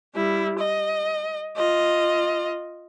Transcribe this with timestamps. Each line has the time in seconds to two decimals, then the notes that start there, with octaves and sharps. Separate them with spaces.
0.15 G3 E4
0.59 D#5
1.57 F4 D#5